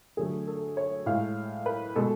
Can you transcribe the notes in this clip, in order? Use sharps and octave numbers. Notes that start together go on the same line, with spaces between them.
D3 F#3 A3 G#4
A4
C#5
A2 G#3 F5
B4
B2 G#3 A4